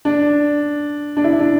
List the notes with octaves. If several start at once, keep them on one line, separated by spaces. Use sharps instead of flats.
D4
D4
E4
D4